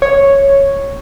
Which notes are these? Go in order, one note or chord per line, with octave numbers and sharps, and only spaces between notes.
C#5